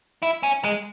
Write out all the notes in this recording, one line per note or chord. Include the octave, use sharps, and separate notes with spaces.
E4
C#4
G#3